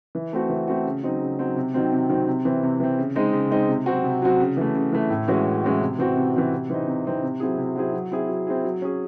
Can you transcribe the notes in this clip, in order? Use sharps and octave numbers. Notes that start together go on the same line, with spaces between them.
E3
A3 C4 F#4
E3
A3 C4 F#4
C#3
F#3 C4 D#4
C#3
F#3 C4 D#4
C3
D#3 F#3 C4
C3
D#3 F#3 C4
C3
E3 C4
C3
E3 C4
C#3
G#3 C4 D#4
C#3
G#3 C4 D#4
C3
F#3 C4 F#4
C3
F#3 C4 F#4
C#3
E3 A3
C#3
E3 A3
A2
E3 G#3 C#4 F#4
A2
E3 G#3 C#4 F#4
C3
E3 C4 F#4
C3
E3 C4 F#4
C3
E3 C4 D#4
C3
E3 C4 D#4
C3
F#3 C4 E4 G#4
C3
F#3 C4 E4 G#4
F#3
C4 E4 G#4
F#3
C4 E4 G#4
F#3
C#4 G#4